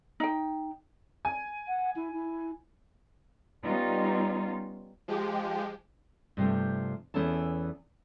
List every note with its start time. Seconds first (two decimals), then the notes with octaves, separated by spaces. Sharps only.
0.20 D#4 G5
1.25 G#5
1.68 F#5
1.96 E4
2.13 E4
3.63 G3 B3 C#4 D#4 F4
5.08 F3 G#3 G4
6.37 G2 C3 F3 A3
7.14 E2 E3 B3 C#4 A4 A5